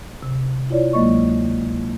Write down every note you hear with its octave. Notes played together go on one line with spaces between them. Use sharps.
C3
E4 F4 C#5 D5
D2 F#3 G#3 A#3 D#5 C#6